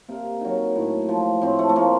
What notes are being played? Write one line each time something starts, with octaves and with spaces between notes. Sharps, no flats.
C3 A#3
D#3 F#3
A2
F3
A2 C4
A3
A3
F3 A#3